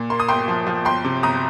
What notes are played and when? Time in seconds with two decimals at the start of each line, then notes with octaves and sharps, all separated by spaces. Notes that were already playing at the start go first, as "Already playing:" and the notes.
Already playing: A#2
0.10 A#3 C6
0.20 D#6
0.28 G1 G5 C6
0.48 F3
0.67 F3
0.85 G1 G5 C6
1.04 C3
1.23 G1 A#5 D#6